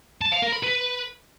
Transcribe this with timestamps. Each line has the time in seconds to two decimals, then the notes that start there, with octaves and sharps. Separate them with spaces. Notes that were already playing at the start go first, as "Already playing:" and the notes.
0.21 A5
0.32 F5
0.42 A#4
0.53 B5
0.63 B4